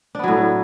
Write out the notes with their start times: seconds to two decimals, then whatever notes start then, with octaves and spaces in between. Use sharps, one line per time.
0.15 D4
0.19 B3
0.23 F#3
0.28 A2